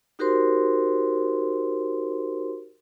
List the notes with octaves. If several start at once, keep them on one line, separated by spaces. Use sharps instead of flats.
D#4 F#4 G4 A#4 C5 C6